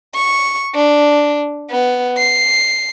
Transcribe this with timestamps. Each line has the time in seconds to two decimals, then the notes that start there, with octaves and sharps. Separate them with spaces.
0.15 C#6
0.75 D4
1.71 B3
2.18 C7